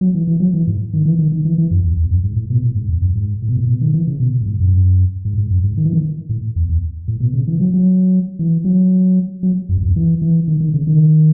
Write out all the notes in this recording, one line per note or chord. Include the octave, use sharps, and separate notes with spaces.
F#3
E3
E3
F#3
E3
G#2
D#3
E3
D#3
D#3
E3
E3
F#2
E2
E2
F#2
G#2
A2
B2
A2
G#2
E2
F#2
G#2
A2
B2
A2
B2
D#3
E3
C#3
B2
A2
G#2
F#2
G#2
G#2
F#2
G#2
D#3
E3
D#3
A2
E2
E2
A2
B2
C#3
E3
F#3
F#3
E3
F#3
F#3
F#2
E2
F#2
E3
E3
D#3
D#3
C#3
D#3